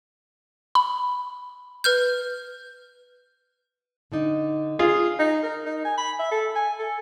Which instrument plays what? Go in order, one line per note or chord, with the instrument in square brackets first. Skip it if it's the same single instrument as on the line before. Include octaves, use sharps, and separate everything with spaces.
[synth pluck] B5
[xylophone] B4 F6 G6
[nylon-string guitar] D3 D4 D#4
[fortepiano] F4 G#4
[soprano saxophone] D#4
A#4
D#4
G#5
B5
E5
A4
G#5
A4